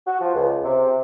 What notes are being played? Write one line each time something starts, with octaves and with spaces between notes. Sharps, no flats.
F#4
F3
C#2
C3